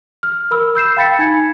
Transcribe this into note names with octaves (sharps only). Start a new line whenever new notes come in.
F6
A#4 B5 E6
E6 G6 C7 E7
F5 G5 B5 A6 B6 C#7
D#4 G#5 G#6 C#7